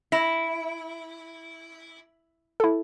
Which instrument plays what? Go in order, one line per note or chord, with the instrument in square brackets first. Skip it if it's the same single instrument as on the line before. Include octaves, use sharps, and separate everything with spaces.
[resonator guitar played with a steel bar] E4 [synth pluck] A#6 E7
[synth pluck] E4 A4